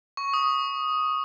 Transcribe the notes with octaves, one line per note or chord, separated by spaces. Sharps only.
C#6
D#6